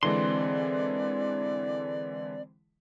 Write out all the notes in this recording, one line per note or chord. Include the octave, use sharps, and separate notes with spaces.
D3 E3 G#3 C4 D5 C6